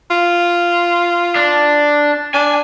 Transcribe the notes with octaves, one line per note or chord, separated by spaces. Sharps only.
F4
D4
D4 G#5